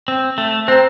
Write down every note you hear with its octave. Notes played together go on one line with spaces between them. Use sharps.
C4
A3
C4 C5 G5 A#5